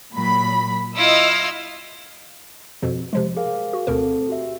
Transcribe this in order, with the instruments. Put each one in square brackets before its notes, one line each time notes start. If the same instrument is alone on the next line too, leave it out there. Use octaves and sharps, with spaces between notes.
[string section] A#2 F#3 B5
[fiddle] E4 F4 [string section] D#5 E6 F6
[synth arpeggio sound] F2 B2 F3
C3 F3 G#3
[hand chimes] G#4 A#4 F5
[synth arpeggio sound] F#4
[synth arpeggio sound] D2 B2 A#4 [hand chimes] C4 A4
[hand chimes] F#4 G4 E5